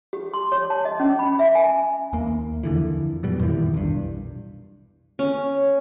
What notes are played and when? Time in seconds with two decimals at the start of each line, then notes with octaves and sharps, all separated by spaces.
0.13 G4
0.34 C6
0.52 C#5
0.70 A5
0.85 D#5
1.00 C#4
1.19 B5
1.39 E5
1.55 G#5
2.13 D#2 A#3
2.63 F2 D3 E3
3.23 F#2 B2 G3
3.40 F2 A#2 D#3 E3
3.74 B1 G2
5.19 C#4